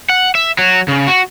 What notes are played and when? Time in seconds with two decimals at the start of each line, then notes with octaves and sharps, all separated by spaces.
0.10 F#5
0.35 E5
0.59 F#3
0.88 C#3
1.07 F#4